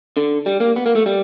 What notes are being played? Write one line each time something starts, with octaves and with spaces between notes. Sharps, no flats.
D3
G3
A#3
B3
A#3
A3
G3